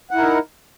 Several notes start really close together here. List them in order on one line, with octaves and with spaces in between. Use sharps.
F#5 E4 A#4 D#4